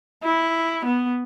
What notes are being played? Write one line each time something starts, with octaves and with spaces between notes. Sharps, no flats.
E4
B3